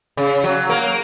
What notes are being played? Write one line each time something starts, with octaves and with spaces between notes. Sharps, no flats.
C#3
F#3
A#3